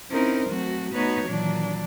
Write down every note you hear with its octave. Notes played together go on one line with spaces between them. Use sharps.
C4 C#4 D#4 E4 A#4 C5
F#3 A3 C4 F#4
A3 B3 D#4 F#4 B4 C#5
A#2 D#3 E3 F#3 D4